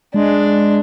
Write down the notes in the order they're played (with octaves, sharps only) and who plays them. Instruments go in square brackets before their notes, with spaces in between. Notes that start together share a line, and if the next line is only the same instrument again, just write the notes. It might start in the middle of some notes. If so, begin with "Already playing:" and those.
[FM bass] G#3 [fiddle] D4